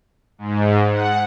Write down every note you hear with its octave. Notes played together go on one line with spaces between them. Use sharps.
G#2
F#5